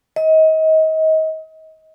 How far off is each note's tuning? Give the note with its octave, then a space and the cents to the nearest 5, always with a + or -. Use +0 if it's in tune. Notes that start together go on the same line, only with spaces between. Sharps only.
D#5 +30